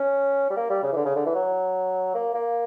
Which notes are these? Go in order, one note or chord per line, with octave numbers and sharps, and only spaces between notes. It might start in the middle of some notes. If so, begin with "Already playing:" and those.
Already playing: C#4
G3
A#3
G3
C#3
E3
D3
C#3
D3
E3
F#3
A#3
A#3